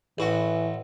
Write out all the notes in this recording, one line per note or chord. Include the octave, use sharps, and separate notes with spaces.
A1 E3 F#4